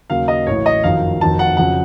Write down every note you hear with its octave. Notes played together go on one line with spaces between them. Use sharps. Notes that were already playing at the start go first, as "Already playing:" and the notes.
D#2 C#3 F#3 F5
D#5
A1 A2 F#3 C#5
D#5
F#1 F2 D#3 F#3 F5
F1 F2 D#3 F#3 A5
F#5
F2 C#3 F#3 F#5